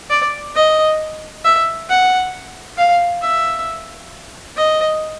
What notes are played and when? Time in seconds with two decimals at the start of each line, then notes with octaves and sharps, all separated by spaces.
0.10 D5
0.56 D#5
1.45 E5
1.90 F#5
2.78 F5
3.22 E5
4.56 D#5